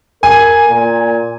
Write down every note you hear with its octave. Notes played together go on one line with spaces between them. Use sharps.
A#4 G#5
A#2